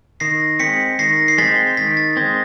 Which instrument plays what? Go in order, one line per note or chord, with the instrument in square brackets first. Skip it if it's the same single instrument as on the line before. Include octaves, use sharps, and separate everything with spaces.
[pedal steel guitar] D#3 [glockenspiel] A#6 C7
[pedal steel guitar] G#3 C4 [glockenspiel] B6 C#7
[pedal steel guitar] D#3 [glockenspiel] A#6 C7
[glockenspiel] C7
[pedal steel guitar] G#3 C4 [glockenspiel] A6 B6
[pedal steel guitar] D#3 [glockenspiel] A6 B6
[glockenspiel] A6 B6
[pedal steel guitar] G#3 C4 [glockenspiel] G#6 A#6